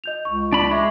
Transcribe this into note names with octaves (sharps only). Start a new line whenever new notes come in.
D#5 G6 F7
C#2 C#6
D4 B5
G#3 E5 C#6 D6